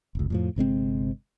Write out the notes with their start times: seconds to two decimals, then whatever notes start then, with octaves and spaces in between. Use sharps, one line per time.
0.15 F1 C#2
0.30 F2 A2 F3
0.56 G1 C3 G#3 C4